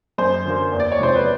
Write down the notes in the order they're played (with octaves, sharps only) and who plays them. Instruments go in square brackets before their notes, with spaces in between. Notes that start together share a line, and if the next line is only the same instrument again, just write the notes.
[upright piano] F#2 C5
D3 F#3 A#3
E2
D5
C#5
C3 F3 G#3 C5
B4